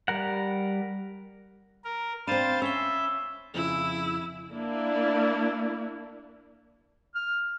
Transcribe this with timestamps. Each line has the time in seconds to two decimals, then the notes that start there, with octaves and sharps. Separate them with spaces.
0.08 G3 A#4 F#5
1.85 A#4
2.27 C4 D4 C5 F5 B5 A6 D#7 E7
2.62 C#4 E5 E6 G#6 G7
3.55 F2 C#3 E4
4.54 A#3 D4 E4
7.15 F6